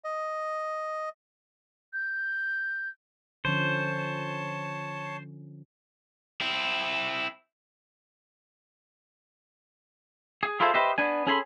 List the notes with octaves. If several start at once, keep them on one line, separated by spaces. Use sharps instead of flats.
D#5
G6
D3 F3 C#4 C5 C#5 A5
C4 E4
G#4
E4 F4 G#4 A4 C5
G4 B4 C5 D#5 E5
B3 D4 G#5
C#4 G#4 A4 G#5 B5 C6